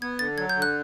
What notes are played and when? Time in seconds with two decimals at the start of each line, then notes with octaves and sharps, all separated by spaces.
0.02 B3 G#6
0.19 D3 A6
0.38 F#3 G#6
0.49 G6
0.56 D3
0.62 F#6